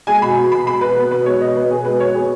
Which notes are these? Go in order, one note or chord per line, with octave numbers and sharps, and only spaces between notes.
G#3 G#5
B2 B5
B3
B2 B5
G#3 B5
B2 B4
B3 B4
B2 B4
G#3 C#5
B2 D#5
B3 B4
B2 G#4
G#3 B4
B2 C#5
B3 G#4